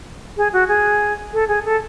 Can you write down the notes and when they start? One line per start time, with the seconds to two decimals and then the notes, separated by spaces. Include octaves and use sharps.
0.37 G#4
0.53 F#4
0.68 G#4
1.33 A4
1.48 G#4
1.65 A4